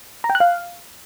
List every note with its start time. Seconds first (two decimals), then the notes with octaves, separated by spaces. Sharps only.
0.24 A#5
0.30 G5
0.35 F#6
0.40 F5